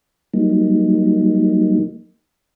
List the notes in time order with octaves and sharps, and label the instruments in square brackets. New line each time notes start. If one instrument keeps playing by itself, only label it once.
[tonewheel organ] F#3 G3 A#3 D#4